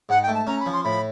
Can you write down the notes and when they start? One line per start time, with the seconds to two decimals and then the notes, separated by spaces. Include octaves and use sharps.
0.09 G#2 F#5
0.23 G5
0.28 A3
0.34 A5
0.47 C#4 A#5
0.60 B5
0.66 F3
0.72 C6
0.84 A2 B5